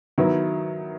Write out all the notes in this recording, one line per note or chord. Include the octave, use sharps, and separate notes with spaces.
D#3 F#3 B3 E4